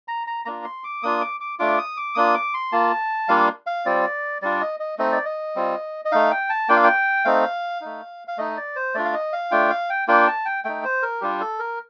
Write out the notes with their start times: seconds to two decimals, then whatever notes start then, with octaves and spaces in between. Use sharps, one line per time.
0.08 A#5
0.27 A#5
0.45 A#3 D4 F4 A#5
0.64 C6
0.84 D6
1.03 A#3 D4 F4 D#6
1.21 D6
1.40 D6
1.59 A3 D4 F4 D6
1.78 D#6
1.97 D6
2.15 A#3 D4 F4 D#6
2.34 D6
2.54 C6
2.72 A#3 F4 A5
3.28 G3 A#3 D4 F4 F5
3.67 F5
3.86 G3 C4 F4 D5
4.42 G3 D4 F4 D5
4.61 D#5
4.80 D#5
4.98 A3 C4 D#4 D#5
5.12 D5
5.25 D#5
5.55 G3 C4 F4
6.05 D#5
6.12 A3 D#4 F5
6.31 G5
6.50 A5
6.69 A#3 D4 F4 G5
6.77 F5
6.84 G5
7.25 A3 C4 D#4 F5
7.81 A3 D#4
8.28 F5
8.38 A3 D#4 D#5
8.57 D5
8.76 C5
8.95 A3 D4 F4 D5
9.05 F5
9.14 D#5
9.33 F5
9.51 A3 D4 F4 G5
9.70 F5
9.90 G5
10.08 A#3 D4 F4 G5
10.27 A5
10.45 G5
10.64 A3 D#4 G5
10.84 C5
11.02 A#4
11.21 G3 D4 F4 G4
11.41 A4
11.59 A#4